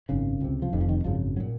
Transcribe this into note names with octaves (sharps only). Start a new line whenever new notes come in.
G#1 F#2 C#3
C#2 C3
F3
F1 F2 C3 D#3
F3
D#3
G#1 F#2 C#3 F3
F#3
A#2